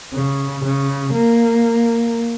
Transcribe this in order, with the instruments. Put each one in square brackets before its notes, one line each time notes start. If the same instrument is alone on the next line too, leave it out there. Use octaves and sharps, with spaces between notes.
[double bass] C#3
C#3
A#3